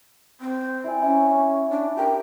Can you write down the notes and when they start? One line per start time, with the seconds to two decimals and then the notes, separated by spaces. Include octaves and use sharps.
0.41 C4
0.84 E4 D5 G#5
1.02 C#4 E4
1.70 D4
1.97 G4 A#4 G5